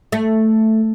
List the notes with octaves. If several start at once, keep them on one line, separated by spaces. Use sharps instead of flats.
A3